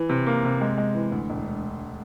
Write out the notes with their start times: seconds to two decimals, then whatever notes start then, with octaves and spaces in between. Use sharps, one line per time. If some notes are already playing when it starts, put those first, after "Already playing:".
Already playing: E3
0.09 C3
0.26 A#3
0.45 C3
0.61 G#3
0.77 G#3
0.94 E3
1.12 D2
1.30 E1